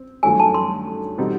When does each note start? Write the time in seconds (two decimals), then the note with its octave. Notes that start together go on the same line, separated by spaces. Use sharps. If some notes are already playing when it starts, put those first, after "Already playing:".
Already playing: C4
0.23 G2 D#3 F#3 A3 C#4 G#5
0.40 A5
0.54 C6
1.18 B2 G3 C4 D#4